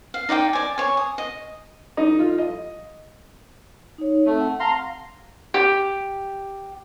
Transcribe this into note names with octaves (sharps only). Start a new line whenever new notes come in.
F5
D#4 D5 F#5 G5
D5 G#5
C#5 G#5
D#6
D#5
D#4
F4
D#5
D#4 C#5
A3 C4
F#5
F5 A5 A#5 C6
G4